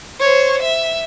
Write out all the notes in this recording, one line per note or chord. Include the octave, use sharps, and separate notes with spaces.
C5 C#5
E5